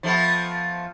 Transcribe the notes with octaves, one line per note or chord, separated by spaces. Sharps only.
F3 A3 B3